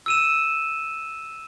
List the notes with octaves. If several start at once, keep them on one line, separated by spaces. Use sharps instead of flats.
E6 D#7 E7